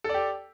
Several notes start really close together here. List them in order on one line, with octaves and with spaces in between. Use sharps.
A4 D5 G4